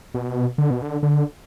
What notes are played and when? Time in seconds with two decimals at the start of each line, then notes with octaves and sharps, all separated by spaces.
0.14 B2
0.58 D3
0.70 B2
0.82 D3
1.03 D3